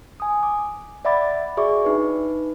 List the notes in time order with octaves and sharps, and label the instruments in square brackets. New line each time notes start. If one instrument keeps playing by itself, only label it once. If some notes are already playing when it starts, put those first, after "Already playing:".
[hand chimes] G#5 D#6
D6
D5 E5 F#5 B5 D6 A6
F#4 G#4 D5 E5 C#6 D6
D4 D#4 B4